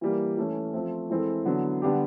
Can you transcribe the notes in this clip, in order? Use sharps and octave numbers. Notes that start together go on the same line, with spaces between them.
E3 G3 A#3
E3 A3 C#4
F3 A3 C4
E3 G#3 C4 E4 A4
D3 F#3 B3 E4
D3 G3 B3 D4 G4